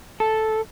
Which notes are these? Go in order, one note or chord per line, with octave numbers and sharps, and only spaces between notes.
A4